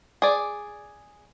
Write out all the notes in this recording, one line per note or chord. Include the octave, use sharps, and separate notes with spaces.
G#4 D5